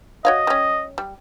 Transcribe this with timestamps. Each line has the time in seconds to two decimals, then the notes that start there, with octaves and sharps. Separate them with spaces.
0.25 F#4 C#5 D#5 F5
0.47 G3 C#4
0.98 G3